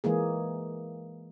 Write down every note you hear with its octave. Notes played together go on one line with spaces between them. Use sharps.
E3 G#3 A#3 G#4